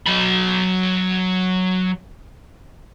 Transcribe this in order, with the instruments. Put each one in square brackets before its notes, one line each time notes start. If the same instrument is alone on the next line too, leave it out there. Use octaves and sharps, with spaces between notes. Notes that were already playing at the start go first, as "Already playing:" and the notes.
[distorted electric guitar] F#3 B5